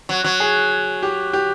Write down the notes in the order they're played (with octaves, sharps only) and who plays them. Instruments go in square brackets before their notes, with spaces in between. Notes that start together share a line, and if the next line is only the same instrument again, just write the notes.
[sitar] F#3
F#3
[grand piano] G#4
G4
G4